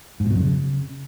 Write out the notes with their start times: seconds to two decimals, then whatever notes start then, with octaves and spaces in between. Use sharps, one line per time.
0.20 G#2
0.25 A#2
0.30 B2
0.35 F#2
0.40 C#3